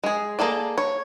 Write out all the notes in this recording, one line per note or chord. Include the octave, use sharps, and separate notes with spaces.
G#3 G#4
A#3 G#4 A4 D5
C#5